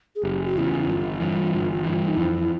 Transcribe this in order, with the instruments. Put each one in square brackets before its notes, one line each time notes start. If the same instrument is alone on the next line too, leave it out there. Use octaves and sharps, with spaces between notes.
[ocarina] G#4
[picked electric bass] F#1 [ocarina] G4
[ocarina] F#4
[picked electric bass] E2 C#3 [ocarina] E4
[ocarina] F4
E4
[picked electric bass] G1 [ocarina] F4
[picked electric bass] G2 E3
G1
G2 E3
[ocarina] D#4
[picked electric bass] F2 [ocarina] E4